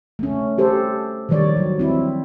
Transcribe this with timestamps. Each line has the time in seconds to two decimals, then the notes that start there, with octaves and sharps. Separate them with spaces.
0.19 A3 C#4
0.58 G4 A4 C5
1.29 D#3 F3 G3 C#5 D5
1.57 F#3
1.79 C4 E4